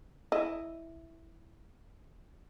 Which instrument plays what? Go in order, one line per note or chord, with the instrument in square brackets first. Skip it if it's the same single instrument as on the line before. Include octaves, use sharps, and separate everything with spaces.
[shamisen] E4 D#5